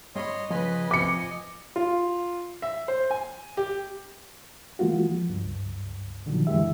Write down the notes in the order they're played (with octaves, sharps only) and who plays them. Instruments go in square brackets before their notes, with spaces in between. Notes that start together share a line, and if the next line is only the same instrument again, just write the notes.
[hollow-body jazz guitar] G2 B5 [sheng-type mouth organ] C#5 D#5 C6
[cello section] C#3 B4 [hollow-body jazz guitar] F3 [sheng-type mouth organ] D#5 G#5
[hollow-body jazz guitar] C3 [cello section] F3 [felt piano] D6 C#7
[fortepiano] F4
E5
C5
G#5
G4
[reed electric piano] E3 G#3 A#3 F4 F#4
F3
C#2 G2
A#2 D3 D#3 F3 F#3
F#2 D3 E3 G#3 G4 E5